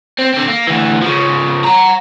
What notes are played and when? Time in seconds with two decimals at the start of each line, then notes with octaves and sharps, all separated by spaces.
0.18 C4
0.34 D3 C4
0.48 A#3
0.67 D2 E3
1.02 C#3 F3
1.64 F#5 A#5